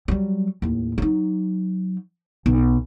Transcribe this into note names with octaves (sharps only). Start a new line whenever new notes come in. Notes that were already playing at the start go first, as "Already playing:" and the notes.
F#3 G3
D#2 A2
F#3 D#4
B1